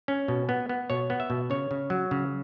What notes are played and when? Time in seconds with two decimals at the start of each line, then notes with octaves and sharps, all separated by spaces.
0.08 C#4
0.28 B2
0.49 B3
0.69 B3
0.90 B2 C#5
1.10 B3
1.20 E5
1.30 B2
1.50 C#3 C#5
1.71 C#3
1.90 F#3
2.11 C#3